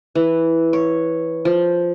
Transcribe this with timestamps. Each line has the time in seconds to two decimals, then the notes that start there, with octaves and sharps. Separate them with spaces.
0.15 E3
0.73 C#5
1.45 F3